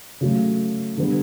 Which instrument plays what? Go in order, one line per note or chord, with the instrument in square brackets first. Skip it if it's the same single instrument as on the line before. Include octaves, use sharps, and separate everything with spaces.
[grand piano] C#3 F#3 A3
D3 G3 B3